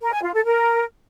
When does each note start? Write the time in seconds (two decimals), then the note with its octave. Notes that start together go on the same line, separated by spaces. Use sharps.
0.01 A#4
0.12 G#5
0.23 F4
0.34 A4
0.45 A#4